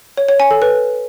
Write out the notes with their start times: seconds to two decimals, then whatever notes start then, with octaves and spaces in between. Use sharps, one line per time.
0.17 C#5
0.29 C#5
0.40 G#5
0.51 A4
0.62 B4